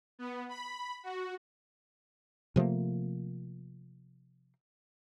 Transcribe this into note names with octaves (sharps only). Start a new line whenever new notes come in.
B3
B5
F#4
C3 F3 A3 A#3